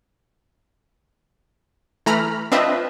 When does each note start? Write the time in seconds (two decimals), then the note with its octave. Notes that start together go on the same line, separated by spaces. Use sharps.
2.06 E3 A3 A#5 B5 F6
2.52 C4 D4 F4 B4 D#5 E5